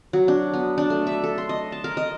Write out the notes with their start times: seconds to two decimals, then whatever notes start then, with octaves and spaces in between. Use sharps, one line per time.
0.13 F#3
0.28 D4
0.53 B3
0.78 D4
0.90 A3
1.07 E5
1.24 A4
1.38 C6
1.49 D#5
1.72 A5
1.84 A#4
1.97 D#5